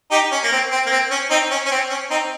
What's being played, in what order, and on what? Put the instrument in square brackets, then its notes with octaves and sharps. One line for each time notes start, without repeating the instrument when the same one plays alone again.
[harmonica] D#4 G4
C#4
A#3
C4
C4
A#3
C4
C#4
C4 D#4
C#4
C#4
C4
C#4
C4 D#4